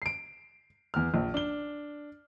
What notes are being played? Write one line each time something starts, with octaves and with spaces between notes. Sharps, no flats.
C7 D7
E2 F6
A#1
D4 G7